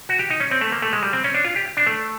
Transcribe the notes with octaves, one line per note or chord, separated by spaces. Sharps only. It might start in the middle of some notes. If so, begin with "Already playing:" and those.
F#4
G4
D#4
C#4
C4
A3
A#3
A3
G#3
G3
C4
C#4
D4
F4
G4
D4
A3